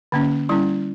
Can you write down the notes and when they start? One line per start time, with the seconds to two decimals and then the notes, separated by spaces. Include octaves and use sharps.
0.12 D3 A#3 C#4
0.49 G3 C#4 E4